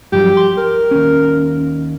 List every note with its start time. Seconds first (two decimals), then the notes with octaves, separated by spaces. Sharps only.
0.12 G2 F3 F#3 G4
0.37 C6
0.58 A#4
0.91 D#2 C#4